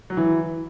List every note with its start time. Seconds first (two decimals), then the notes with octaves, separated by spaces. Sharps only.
0.10 F#3
0.17 E3